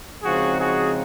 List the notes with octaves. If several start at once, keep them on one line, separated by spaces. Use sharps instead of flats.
C#3 F3 G#3 C4 D#4 F#4 G#4
F#4 G#4